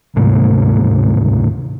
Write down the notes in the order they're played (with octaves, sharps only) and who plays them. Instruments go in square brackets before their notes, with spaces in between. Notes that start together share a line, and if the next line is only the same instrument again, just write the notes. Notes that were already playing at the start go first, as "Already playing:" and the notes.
[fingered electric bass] D1 G#2 C3 A3